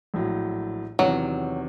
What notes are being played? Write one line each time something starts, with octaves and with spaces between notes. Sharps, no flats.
A#1 A2 F#3
E2 C3 D#3 F#3